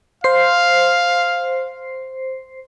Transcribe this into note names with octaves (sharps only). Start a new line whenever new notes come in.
C5 F5 C7